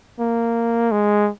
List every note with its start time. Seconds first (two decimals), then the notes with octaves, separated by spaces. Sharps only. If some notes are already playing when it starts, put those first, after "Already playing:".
0.19 A#3
0.92 G#3